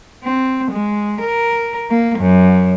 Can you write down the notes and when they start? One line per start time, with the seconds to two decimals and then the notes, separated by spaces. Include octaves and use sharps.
0.24 C4
0.71 G#3
1.20 A#4
1.91 A#3
2.19 F#2